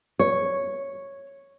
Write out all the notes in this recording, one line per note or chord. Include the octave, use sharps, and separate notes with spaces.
C#5